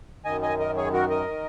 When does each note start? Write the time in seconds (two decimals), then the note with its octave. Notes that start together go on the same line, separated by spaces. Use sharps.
0.25 F#2 D#3 D#5 G#5
0.42 D#5 G#5
0.59 A#4 D#5
0.77 G#4 C#5
0.93 F#4 A#4
1.10 A#4 D#5
1.27 D#3